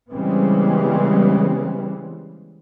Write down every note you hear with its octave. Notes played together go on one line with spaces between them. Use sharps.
C#3 E3 G3 G#3 B3 C4